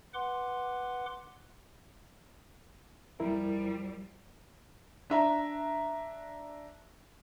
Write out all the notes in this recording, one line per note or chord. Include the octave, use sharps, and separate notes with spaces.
B4 F#5 C6 D6
F2 F3 G3 E4 A#4
D4 E5 A#5